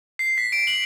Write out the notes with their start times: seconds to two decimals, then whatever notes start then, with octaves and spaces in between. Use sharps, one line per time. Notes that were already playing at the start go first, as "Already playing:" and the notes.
0.19 C7
0.38 B6
0.52 D7
0.67 F#7